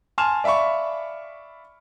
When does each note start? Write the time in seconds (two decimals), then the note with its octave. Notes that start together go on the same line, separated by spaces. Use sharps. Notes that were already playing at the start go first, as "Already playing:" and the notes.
0.18 G#5 A5 C6 F6 E7
0.44 D5 E5 F5 B5 C#6